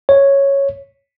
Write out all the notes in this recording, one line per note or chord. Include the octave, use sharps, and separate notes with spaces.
C#5